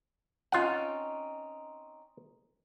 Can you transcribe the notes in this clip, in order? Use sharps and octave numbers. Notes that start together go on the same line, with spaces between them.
C4 C#4 D#4 F4 F#5